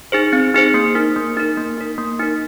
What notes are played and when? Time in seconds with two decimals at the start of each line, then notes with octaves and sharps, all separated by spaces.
0.12 D#4 G#4 C5
0.33 C4
0.54 D#4 G#4 C5
0.74 A#3
0.95 D#4 A#4
1.16 A#3
1.37 D#4 A#4
1.57 A#3
1.78 D#4 A#4
1.98 A#3
2.19 D#4 A#4